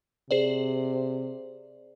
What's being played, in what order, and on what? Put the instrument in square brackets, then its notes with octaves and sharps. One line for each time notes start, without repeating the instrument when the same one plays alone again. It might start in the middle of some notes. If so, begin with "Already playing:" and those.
[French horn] C3 [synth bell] G#4 C5 D5